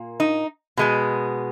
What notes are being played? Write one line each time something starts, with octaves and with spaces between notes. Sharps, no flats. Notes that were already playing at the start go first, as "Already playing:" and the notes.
Already playing: A#2 A#3
D#4
B2 G#3 B3